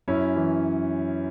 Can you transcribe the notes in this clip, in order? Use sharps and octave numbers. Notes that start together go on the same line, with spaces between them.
F#2 C#4 E4
E3